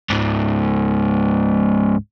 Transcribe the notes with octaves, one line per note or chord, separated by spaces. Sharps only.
C#2 G#2